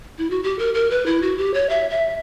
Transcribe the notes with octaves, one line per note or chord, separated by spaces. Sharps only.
E4
F#4
G4
A#4
A#4
B4
E4
F#4
G4
C#5
E5
E5